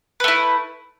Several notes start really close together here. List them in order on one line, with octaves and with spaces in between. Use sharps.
B4 A3 E4